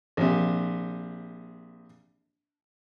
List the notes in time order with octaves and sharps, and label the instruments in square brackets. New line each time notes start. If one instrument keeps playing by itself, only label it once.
[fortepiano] A#1 C3